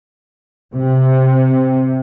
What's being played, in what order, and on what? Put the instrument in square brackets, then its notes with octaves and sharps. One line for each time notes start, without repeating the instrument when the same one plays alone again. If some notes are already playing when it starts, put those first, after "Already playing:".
[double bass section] C3